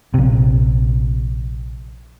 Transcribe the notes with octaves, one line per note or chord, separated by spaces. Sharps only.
A#1 C3